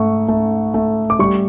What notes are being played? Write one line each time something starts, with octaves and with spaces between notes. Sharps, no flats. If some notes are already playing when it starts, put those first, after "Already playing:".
Already playing: G#2 A3 C#6
A3
A3
D6
G3 C#6